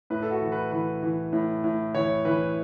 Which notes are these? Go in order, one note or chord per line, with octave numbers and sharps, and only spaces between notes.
A2 B4
A4
F#4
E3
B4
E3 B4
E3
A2
A2
E3 C#5
E3 B4